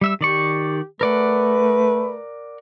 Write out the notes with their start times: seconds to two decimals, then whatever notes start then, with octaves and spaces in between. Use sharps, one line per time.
0.01 G3 E5 E6
0.21 D#3 G4 D5 C#6
1.01 A3 A#4 B4 D5 F#5